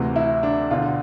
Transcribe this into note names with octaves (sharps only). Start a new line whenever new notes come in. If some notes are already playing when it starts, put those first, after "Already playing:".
Already playing: D2 C3 E3
E4
D4
E1 E2 D3 F4